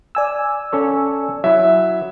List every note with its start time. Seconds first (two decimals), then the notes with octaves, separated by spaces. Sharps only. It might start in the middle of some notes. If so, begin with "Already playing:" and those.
0.15 D5 G#5 E6
0.72 C#4 A4 C#5
1.44 F#3 E4 E5